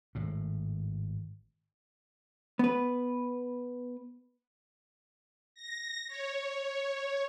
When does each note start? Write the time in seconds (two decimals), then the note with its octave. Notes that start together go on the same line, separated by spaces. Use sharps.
0.15 G#1 A2
2.59 B3 B4
5.55 A#6
6.07 C#5